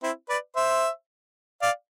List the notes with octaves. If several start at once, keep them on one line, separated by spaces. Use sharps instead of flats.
C4 E4
B4 D5
C5 E5
D5 F5